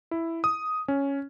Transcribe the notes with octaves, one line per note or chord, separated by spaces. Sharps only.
E4
D#6
C#4